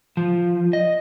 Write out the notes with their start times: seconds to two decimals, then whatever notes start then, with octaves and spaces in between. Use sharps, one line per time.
0.17 F3
0.73 D#5